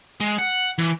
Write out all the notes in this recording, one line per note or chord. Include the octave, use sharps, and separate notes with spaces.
G#3
F#5
E3